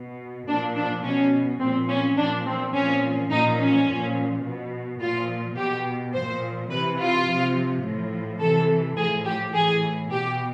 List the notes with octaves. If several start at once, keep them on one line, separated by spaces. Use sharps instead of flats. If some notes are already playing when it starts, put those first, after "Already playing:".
Already playing: B2
A#2 F3 D4
D4
B2 C#4
A#2 F3 C4
C#4
A#2 F3 D4
C4
A#2 F3 C#4
A#2 F3 D#4
C#4
A#2 F3
B2
A#2 F3 F4
B2 G4
A#2 F3 C5
C3 E3 B4
F4
C3 F3
A2 F3
C3 E3 A4
A2 F3 G#4
G4
A2 E3 G#4
B2 G4